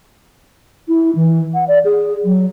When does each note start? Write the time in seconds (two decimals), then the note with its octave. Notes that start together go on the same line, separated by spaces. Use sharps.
0.88 E4
1.15 E3
1.54 F#5
1.68 D5
1.85 G#4
2.25 F#3